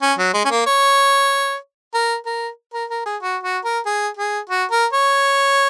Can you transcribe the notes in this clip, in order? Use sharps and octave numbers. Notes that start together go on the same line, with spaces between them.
C#4
F#3
G#3
C#4
A#3
C#5
A#4
A#4
A#4
A#4
G#4
F#4
F#4
A#4
G#4
G#4
F#4
A#4
C#5